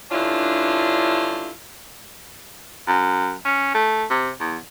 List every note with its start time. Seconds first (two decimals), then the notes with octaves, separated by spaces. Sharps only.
0.11 G2 D3 C#4 D4 E4 F4
2.88 F#2
3.45 C#4
3.74 A3
4.10 C3
4.40 E2